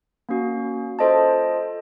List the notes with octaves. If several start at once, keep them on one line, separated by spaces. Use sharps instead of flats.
A#3 C#4 F#4
F4 A4 C5 D#5 A5